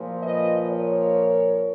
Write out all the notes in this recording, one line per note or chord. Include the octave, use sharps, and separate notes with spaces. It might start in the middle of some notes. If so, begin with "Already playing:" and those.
Already playing: A#2 F3
B4 D#5
A#4 C#5